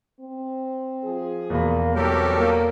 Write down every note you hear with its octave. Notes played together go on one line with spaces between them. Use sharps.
C4
F3 G#4
E2 B2 A#3 B5
E3 F#3 G3 C4 G4 A4 A#4
A#3